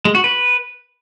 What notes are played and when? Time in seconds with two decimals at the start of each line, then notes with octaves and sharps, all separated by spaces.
0.05 G#3
0.15 F#4
0.24 B4